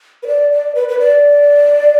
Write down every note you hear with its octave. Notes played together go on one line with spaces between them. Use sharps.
B4
D5
D5
B4
B4
D5